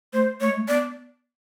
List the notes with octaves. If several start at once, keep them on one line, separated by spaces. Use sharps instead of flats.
A3 C5
A3 C#5
G#3
A3
B3 D5